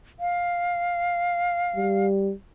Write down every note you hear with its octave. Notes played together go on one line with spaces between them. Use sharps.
F5
G3